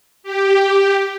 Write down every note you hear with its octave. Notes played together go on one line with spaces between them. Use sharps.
G4